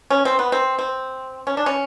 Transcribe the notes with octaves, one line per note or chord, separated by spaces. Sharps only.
C#4
C4
B3
C4
C4
C#4
D4
C#4